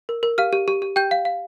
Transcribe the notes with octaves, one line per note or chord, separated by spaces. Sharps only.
A#4
A#4
G4 F5 F6
G4
G4
G4
G4 G5 G6
F5
F5